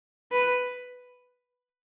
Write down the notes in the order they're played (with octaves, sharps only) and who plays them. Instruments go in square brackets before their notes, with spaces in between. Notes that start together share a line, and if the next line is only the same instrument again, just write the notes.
[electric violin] B4